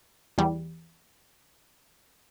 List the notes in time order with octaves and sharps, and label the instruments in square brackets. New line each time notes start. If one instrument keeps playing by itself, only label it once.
[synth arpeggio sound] E2 G3